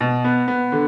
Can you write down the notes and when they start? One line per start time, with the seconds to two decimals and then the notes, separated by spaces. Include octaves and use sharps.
0.01 B2
0.24 B3
0.48 B3
0.72 D3